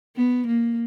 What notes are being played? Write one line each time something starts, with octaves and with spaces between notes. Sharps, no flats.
B3
A#3